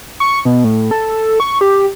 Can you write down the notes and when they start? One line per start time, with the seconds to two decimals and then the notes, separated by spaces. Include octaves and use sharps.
0.20 C#6
0.45 B2
0.64 A2
0.91 A4
1.40 C#6
1.61 G4